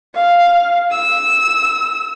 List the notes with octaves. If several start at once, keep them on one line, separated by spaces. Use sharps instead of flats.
F5
E6